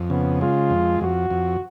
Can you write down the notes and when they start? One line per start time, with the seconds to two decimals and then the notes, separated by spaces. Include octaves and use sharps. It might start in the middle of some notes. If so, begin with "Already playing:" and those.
Already playing: F2
0.10 C#3 B3
0.41 G#3 F4
0.70 F2
1.01 F2 F#4
1.30 F2